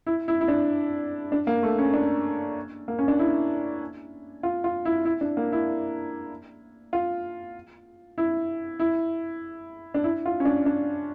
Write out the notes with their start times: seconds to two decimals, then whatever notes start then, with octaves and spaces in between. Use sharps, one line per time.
0.07 E4
0.28 E4
0.41 E4
0.48 D4
1.32 D4
1.47 A#3
1.63 A3
1.78 C#4
1.94 D4
2.88 A#3
2.99 C#4
3.08 D4
3.19 E4
4.43 F4
4.64 F4
4.85 E4
5.05 E4
5.21 D4
5.37 A#3
5.52 E4
6.93 F4
8.18 E4
8.80 E4
9.94 D4
10.04 E4
10.26 F4
10.40 C#4
10.45 D4
10.66 D4